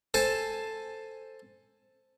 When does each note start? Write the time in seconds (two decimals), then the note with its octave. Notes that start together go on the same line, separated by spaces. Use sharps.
0.14 A4 C5 G#5 A5